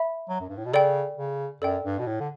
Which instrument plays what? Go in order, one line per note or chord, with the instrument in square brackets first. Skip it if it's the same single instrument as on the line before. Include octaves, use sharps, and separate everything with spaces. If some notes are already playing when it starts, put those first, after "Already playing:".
Already playing: [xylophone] E5 B5
[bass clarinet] F#3
F#2
G2
A2
B2
[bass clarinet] C#3 [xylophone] A4 D5 G5
[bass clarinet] C#3
[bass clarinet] F#2 [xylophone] A4 D5 G5
[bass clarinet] G2
B2
A2
D3